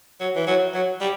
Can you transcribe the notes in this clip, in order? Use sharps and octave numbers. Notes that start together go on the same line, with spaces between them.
F#3
E3
F#3
F#3
G3